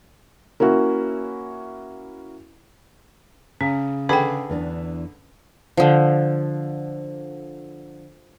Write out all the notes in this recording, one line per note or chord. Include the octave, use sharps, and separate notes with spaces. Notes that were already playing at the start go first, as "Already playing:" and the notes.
A#3 C#4 E4 F#4
C#3 C#4
D3 G#4 B4 G5 B5
E2 E3 D4
D3 F3